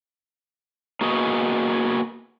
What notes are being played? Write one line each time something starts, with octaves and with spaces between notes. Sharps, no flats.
A#3 B3 F#4 G#4 D#5